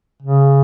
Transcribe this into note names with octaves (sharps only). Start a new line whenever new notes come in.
C#3